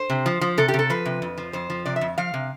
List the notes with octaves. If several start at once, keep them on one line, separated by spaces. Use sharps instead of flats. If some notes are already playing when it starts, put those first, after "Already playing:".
Already playing: C5
C3
F3
F3
C3 A4
G4
C3
A4
F3 B4
C3
F2
F3
F2 C5
F3
C3 D5
E5
F2
F3 F5
C3